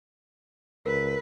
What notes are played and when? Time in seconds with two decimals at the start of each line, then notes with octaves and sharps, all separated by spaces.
0.86 C#2 A#4 B4